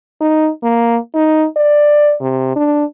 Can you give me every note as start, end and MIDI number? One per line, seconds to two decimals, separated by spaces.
0.21 0.49 63
0.63 0.97 58
1.15 1.46 63
1.57 2.14 74
2.21 2.55 48
2.56 2.84 62